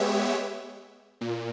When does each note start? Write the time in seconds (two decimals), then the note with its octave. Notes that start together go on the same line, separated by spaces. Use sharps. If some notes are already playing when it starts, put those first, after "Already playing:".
Already playing: G#3 B3 G4 C#5 E5
1.21 A#2